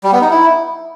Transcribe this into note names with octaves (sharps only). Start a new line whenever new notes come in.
G3
B3
D#4
E4